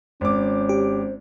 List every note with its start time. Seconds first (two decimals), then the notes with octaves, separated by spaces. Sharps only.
0.21 G#1 C#4 C5 D6
0.69 G4